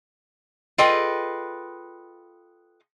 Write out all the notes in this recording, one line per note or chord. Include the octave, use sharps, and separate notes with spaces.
F4 G#4 A4 B4 D#5 G5